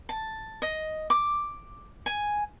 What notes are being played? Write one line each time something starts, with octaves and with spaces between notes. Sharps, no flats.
A5
D#5
D6
G#5